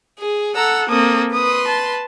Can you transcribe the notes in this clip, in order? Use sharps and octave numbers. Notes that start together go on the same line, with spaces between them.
G#4
A4 F#5 A#5 E6
A#3 C4 A4 D#6
B4 C6 D#6
A5